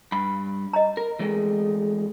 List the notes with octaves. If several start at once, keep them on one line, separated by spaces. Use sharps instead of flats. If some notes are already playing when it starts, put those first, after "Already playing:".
G2 B5
D#5 A#5
A#4
E3 G#3 A3 G#4